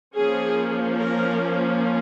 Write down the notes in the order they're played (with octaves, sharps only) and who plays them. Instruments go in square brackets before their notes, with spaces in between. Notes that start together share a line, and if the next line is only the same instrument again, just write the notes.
[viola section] F3 A#3 C#4 G#4
A#4